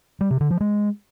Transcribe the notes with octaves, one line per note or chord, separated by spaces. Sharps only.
G3
C3
D3
F3
G#3